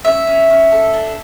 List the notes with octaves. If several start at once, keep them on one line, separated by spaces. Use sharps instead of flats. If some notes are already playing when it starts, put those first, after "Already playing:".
C#4 E5
C#4
C#4
A4
D4